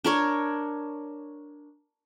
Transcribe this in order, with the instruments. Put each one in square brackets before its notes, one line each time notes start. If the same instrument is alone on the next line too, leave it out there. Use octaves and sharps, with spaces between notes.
[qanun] D4 A#4 C#5